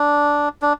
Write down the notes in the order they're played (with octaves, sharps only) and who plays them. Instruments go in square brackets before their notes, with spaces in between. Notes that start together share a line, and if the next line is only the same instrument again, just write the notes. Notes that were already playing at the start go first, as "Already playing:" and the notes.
Already playing: [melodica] D4
D4